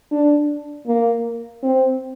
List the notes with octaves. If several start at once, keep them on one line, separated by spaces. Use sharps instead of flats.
D4
A#3
C4